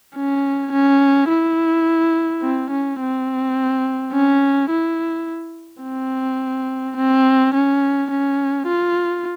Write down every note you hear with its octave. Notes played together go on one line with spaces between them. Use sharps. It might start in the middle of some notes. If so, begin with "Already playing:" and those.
C#4
C#4
E4
C4
C#4
C4
C#4
E4
C4
C4
C#4
C#4
F4